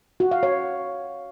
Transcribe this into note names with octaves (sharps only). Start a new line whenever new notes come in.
F#4
F5
C#5